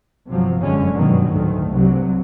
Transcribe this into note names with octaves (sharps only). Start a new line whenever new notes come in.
G1 C3 F3 F#3
F1 F#2 D3 G#3 C#4
G2 B2 D3 D#3 F#3 A#3
D2 A2 D#3 A3
C2 G2 C3 F#3